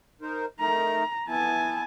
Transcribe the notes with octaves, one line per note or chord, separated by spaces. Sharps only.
D#4 A#4 C5
A3 D#4 A#4 A#5
B3 E4 G#5 A5